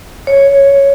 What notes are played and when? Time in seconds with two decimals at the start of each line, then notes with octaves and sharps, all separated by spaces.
0.27 C#5